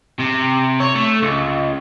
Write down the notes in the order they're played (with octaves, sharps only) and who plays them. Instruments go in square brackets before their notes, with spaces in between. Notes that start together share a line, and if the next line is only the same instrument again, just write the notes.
[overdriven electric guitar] C3
C#5
A3
C#2